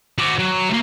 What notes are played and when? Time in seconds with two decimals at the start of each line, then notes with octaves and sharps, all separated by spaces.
0.18 F#4 D5
0.39 F#3
0.69 A3 A#3